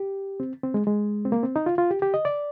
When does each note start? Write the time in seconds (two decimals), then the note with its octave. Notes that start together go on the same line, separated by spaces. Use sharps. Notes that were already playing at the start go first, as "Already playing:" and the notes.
Already playing: G4
0.40 C4
0.63 C4
0.74 G#3
0.87 G#3
1.25 C4
1.32 A#3
1.43 C4
1.56 D#4
1.66 F4
1.78 F4
1.91 G4
2.02 G4
2.14 D#5
2.25 D5